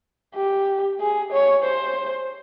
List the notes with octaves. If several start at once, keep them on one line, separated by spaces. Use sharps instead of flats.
G4
G#4
C#5
C5